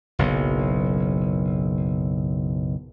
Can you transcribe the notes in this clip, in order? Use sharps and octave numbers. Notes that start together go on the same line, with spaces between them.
F#1 B1